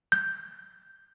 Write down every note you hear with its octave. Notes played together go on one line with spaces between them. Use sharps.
G6